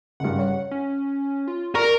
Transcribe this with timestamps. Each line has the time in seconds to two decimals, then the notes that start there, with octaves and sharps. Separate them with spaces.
0.20 F#1 G2 F#5
0.39 C#5
0.71 C#4
1.47 F4
1.75 A#4 D5 C#6